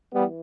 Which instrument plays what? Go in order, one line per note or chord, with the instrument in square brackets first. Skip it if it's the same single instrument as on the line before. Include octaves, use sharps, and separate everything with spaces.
[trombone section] E3 G3 B3